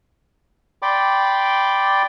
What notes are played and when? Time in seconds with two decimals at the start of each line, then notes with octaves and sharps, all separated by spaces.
0.82 D5 G5 B5 C6 D6